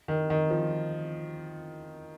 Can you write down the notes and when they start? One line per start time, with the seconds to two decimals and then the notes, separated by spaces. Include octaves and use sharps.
0.08 D#3
0.30 D#3
0.50 F3